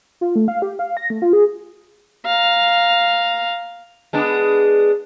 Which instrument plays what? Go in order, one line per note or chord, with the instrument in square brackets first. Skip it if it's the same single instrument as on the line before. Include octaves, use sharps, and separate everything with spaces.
[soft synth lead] F4
A3
F5
G4
F5
A#6
A3
F4
G#4
[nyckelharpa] F5 A#5
[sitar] G#3 B3 D4